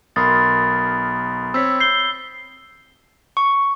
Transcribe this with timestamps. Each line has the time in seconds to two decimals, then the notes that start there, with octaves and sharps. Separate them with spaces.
0.16 B1 A#4 B5 C6 D#6 A6
1.54 C4 C#5 E6 B6
1.80 G6 C7 G7
3.37 C#6